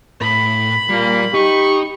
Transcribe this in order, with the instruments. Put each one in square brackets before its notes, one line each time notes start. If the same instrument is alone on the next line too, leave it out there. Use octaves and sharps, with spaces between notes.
[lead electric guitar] A2 [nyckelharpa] B5
[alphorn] A#2 [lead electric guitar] G3 [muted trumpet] A#3
[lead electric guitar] D#4 [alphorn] G4 [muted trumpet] C#6